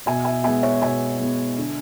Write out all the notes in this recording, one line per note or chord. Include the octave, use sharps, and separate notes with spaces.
B2 E5 G#5
E5 G#5
G#3 B3 E5 G#5
C#5 E5
B2 E5 G#5
G#3 B3
D3